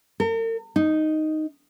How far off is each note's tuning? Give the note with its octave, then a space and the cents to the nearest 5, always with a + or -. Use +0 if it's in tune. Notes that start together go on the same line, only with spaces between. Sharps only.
A#4 -45
D#4 +0